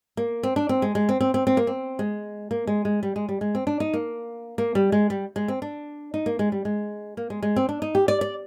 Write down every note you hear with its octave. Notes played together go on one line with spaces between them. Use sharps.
A#3
C4
D4
C4
G#3
G#3
C4
C4
C4
C4
A#3
C4
G#3
A#3
G#3
G#3
G3
G#3
G3
G#3
C4
D4
D#4
A#3
A#3
G3
G#3
G3
G#3
C4
D4
D#4
A#3
G#3
G3
G#3
A#3
G#3
G#3
C4
D4
D#4
G4
D5
D5